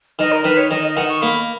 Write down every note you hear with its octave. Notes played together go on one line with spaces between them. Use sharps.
D#3 D#5
A#4
D#3 B4
C#5
D#3 D#5
D#5
D#3 F#5
C#6
A#3 B5